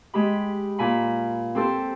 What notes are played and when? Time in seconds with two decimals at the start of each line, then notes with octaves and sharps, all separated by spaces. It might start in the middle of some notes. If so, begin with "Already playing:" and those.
0.14 G#3 G4 B5
0.79 A#2 G#5 B5
1.55 C4 G4 A4 C5